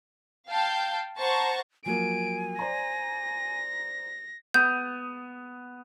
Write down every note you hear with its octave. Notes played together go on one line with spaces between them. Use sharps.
F5 G5 A5 G6
C5 F#5 A5 A#5 C#6
F3 F#3 A#3 G#5 D7
C5 D5 A#5 A#6
B3 G6